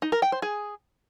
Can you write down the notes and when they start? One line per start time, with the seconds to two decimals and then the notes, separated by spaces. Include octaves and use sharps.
0.02 D#4
0.12 A#4
0.22 G5
0.32 C5
0.42 G#4